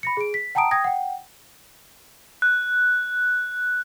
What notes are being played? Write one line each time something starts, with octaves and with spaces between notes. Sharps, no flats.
B5 A#6 C#7
G#4 D7
B6
F#5 G5 A5 A#5 D#6 D7
G5 D#6 G#6 A#6
F#5 G5
F#6